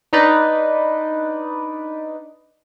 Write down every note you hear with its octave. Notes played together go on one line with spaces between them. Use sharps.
D4 D#4 B4 D5 D#5